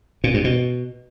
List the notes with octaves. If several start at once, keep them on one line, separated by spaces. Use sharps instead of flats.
A#2
G2
B2